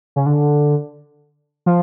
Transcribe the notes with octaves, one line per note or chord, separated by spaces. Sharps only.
C#3
D3
F3